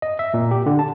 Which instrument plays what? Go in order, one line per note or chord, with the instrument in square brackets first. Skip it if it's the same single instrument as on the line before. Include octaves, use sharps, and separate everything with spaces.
[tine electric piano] D#5
E5
A#2
G4
D3
A5